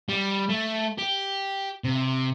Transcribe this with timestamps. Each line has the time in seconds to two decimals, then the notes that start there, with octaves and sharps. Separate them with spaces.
0.09 G3
0.50 A3
0.98 G4
1.84 C3